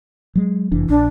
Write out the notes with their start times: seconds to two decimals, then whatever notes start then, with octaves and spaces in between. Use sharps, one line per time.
0.35 F#3 G#3
0.72 F1 E3 D4
0.89 A#1 D4